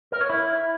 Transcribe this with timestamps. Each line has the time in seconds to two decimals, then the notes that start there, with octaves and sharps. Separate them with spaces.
0.12 A#4
0.21 C#5
0.30 E4